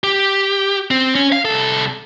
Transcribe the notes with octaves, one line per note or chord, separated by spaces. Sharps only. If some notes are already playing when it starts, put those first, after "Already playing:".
G4
C4
C#4
F5
C2 A4